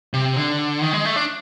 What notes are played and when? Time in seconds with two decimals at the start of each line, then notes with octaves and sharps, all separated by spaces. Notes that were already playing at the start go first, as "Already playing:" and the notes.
0.13 C3
0.37 D3
0.82 D#3
0.93 G#3
1.05 A3
1.16 D4